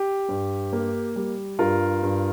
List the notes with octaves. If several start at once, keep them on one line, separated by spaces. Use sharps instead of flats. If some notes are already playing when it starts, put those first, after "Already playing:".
Already playing: G4
G2
A#3
G3
G2 F4 A#4
G2